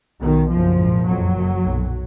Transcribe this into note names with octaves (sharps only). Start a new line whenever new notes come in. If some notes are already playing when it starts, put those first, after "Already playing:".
B1 B2 D#3
F#1 F#2 F3
A#1 G#2
F#1 F2 F#3
F#1 F#2
B1 A#2